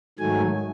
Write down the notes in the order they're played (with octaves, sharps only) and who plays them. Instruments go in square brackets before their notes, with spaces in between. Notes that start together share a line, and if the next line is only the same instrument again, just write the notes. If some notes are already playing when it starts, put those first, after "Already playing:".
[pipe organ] G#2 D#3 F#3 A3 G#5